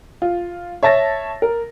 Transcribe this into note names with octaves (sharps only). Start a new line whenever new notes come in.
F4
C#5 E5 A5 A6 A#6
A#4